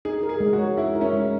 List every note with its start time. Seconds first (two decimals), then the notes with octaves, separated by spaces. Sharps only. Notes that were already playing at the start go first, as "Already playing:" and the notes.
0.05 D#4 G#4
0.23 A#4
0.29 G#4
0.40 G#3
0.53 F#4
0.58 C#5
0.77 D#4 E4
0.95 A#4
1.01 C#4
1.13 G#3